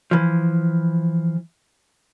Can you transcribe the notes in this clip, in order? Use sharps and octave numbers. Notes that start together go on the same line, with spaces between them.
E3 F3